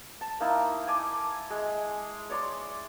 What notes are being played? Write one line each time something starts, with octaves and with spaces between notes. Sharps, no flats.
A5
A#3 D#4 E4
G#5 A5 D6
G#3
C#5 D5 C6